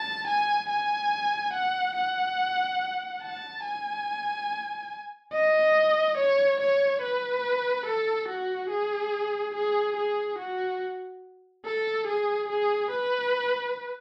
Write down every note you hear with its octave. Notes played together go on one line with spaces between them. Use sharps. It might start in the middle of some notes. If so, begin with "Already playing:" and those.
Already playing: A5
G#5
G#5
F#5
F#5
A5
G#5
D#5
C#5
C#5
B4
A4
F#4
G#4
G#4
G#4
F#4
A4
G#4
G#4
B4